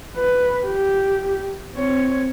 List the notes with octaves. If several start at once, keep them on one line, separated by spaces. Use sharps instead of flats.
B4
G4
C4 C#5